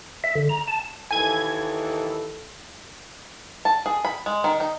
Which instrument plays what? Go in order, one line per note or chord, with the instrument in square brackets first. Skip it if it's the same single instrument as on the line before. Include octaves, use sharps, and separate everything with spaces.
[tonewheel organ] E5
D3
A#5
A5
[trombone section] D#2 E3 A4 [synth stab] G#5 G#6
[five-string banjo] A5
G#4
B5
G#3
D#3
D#4